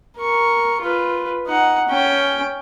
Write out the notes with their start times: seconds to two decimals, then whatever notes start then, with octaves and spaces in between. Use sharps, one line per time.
0.18 A#4 C#6
0.81 F4 B4
1.47 D#4 F#5
1.89 C#4 G5